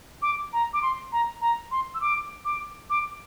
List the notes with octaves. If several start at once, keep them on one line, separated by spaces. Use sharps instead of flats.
D6
A#5
D6
C6
A#5
A#5
C6
E6
D6
D6
D6